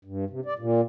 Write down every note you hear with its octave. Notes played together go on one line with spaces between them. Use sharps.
G2
C3
D5
A#2